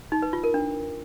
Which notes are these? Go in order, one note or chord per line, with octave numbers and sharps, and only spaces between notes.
D#4
B4
F4
A#4
D4